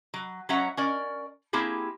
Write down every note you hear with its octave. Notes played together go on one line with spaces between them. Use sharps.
F#3
F#3 C#4 C#5 E5 F#5 A#5
C#4 A#4 D5
A#3 C4 E4 G4 G#4